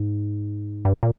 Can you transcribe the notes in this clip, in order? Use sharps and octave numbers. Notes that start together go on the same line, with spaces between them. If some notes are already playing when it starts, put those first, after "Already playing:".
Already playing: G#2
G2
A#2